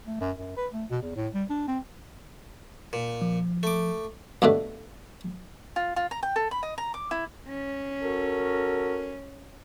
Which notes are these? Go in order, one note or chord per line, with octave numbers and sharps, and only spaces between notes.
A3
F#2
F#2
B4
A3
B2
E2
A2
G3
D4
C4
A#2
F3
A3 D6
G2 B2 D3 A3
F4
F4
A#5
G5
A4
B5
D#5
A#5
D6
E4
C#4
F#4 A4 A#4